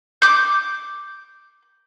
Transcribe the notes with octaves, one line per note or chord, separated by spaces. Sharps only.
D6 G6